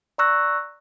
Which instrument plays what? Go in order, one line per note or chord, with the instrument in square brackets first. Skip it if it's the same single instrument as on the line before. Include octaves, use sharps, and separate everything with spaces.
[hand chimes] D5 A#5 C#6 E6 F#6 A#6